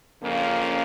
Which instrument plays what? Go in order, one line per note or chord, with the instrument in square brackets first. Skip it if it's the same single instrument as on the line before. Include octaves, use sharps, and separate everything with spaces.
[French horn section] F2 C#3 F3 A#3 C#4